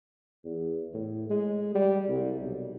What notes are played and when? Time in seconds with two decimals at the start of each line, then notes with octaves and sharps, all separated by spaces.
0.45 E2
0.94 A2
1.30 G#3
1.75 G3
2.08 C2
2.41 B1